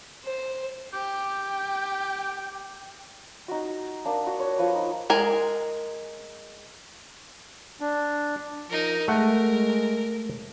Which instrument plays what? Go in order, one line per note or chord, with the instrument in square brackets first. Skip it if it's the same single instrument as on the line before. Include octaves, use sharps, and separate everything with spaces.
[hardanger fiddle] C5
[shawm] G4 [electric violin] G5
[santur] D#4 F#4
A#3 D4
F#4
C#5
F3 B4
D#4
[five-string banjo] G#3 A#4 G#5
[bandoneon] D4
[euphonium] F3 [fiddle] D#4 A#4
[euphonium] G#3 [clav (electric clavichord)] A3 F#5 [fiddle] A#4
[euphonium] G#3